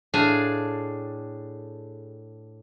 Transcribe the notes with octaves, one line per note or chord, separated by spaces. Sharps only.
A2 D4 G#4 F5